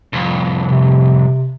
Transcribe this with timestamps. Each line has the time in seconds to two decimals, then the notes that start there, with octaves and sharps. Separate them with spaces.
0.13 C2 F2
0.65 C3